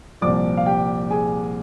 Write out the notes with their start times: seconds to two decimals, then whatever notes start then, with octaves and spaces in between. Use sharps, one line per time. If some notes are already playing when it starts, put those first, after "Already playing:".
0.21 C2 A#2 F3 D5 D6
0.57 F5
0.66 G4 G5
1.10 G#4 G#5